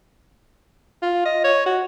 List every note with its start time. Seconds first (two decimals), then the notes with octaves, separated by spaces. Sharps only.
1.02 F4
1.25 D#5
1.44 C#5
1.66 F#4